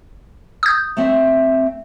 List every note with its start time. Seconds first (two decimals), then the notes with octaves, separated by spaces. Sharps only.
0.63 D#6 G6
0.97 A3 C4 E5